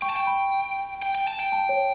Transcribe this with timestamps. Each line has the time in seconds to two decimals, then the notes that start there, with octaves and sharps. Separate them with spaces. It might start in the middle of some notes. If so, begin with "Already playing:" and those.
0.02 G5 C#6
0.10 A5
0.16 G5
0.27 B5
1.02 G5
1.15 G5
1.28 A5
1.40 G5
1.52 A5
1.69 C#5